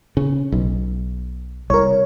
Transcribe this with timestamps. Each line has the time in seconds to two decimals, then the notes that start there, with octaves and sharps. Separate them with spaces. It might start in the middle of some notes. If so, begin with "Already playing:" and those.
0.17 C#3
0.52 B1
1.70 C2 A#4 C#5